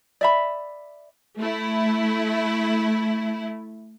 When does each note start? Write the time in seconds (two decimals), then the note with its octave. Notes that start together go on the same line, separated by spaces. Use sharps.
0.21 D5 E5 B5
1.38 A3 E4